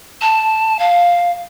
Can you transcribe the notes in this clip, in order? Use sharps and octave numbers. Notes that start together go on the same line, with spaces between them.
A5
F5